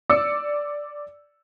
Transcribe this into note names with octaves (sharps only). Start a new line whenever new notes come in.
D5 D6 E6 C#7